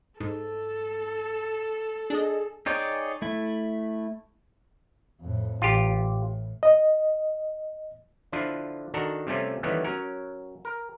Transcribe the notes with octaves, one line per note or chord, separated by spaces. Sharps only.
G#2 A4
D4 G#4 D#5
D#4 G#4 C#5 D5 G5
A3 E4
F2 A2
A1 F4 G4
A2
D#5
D3 F3 D4 E4 F4
D#3 D4 F#4 A4 A#5
C3 G3 A3 C#4 F4
D#3 E3 G3 A3 B3 C#4
F#3 C#4 A#4
A#4